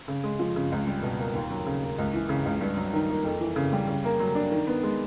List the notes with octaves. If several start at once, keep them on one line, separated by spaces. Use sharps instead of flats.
C#3
G#3
F3
C#3
C#2
G3
B2
A#3
D#2
F#3
C#3
A#3
C#2
E3
C#3
C#2
G2
F#3
D#3
A#3
F2
E3
C#3
G3
C#3
A#3
F#3
D4
D#3
B3
G#3